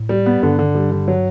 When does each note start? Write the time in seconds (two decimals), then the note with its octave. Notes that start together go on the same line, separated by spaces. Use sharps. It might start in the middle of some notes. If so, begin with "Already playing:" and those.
Already playing: A2
0.09 G3
0.26 B3
0.43 G2 D3
0.59 D3
0.75 G3
0.92 D3
1.08 F#3